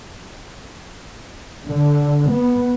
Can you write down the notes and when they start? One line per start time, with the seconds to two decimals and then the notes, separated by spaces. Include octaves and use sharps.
1.66 D3
2.29 B3